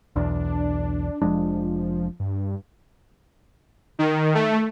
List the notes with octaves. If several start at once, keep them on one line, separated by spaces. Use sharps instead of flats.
B1 E2 D4
F1 F3 G#3 D4
G2
D#3
A3